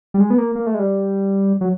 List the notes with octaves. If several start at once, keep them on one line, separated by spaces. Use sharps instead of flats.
G3
G#3
B3
A#3
A#3
A3
G#3
G3
F#3